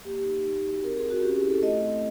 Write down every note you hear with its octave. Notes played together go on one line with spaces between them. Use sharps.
A#3 G4
D#4
D#4
F#4
C4 A#4
G#4
F4
F#4
C#4 G4
G#4
E4
A4
A3 D#5
C4